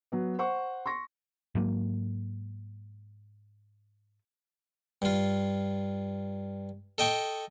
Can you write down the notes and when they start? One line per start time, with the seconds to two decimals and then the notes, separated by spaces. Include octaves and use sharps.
0.12 F#3 B3
0.39 C5 F#5 C#6
0.86 C6 C#6 A#6
1.55 G#2 F#3 A#3
5.02 G2 F4
6.98 A4 D#5 G5 C#6